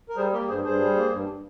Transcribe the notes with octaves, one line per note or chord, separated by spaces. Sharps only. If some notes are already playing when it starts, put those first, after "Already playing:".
A#4
G3 G#4 C5
A#3 G4 A#4
G2 G#4 C5
G2 G#4 C5
G3
A#3
G2